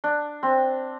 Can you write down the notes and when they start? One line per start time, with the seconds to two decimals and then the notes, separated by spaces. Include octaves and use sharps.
0.04 D4
0.43 C4